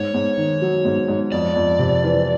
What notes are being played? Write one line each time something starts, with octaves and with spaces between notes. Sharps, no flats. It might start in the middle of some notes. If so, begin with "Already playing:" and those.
Already playing: G#2 C#5
G#2
D#3
F#3
G#2
G#2
F2 D5
F2
C3
E3